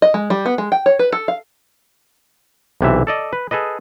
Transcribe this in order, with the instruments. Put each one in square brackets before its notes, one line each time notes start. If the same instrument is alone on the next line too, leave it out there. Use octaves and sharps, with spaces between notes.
[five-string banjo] D#5
G#3
G3
B3
G#3
G5
C#5
B4
A4
F5
[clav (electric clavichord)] B1 C3 E3 E5
A4 D5 D#5
B4
G#4 A4 B4 D#5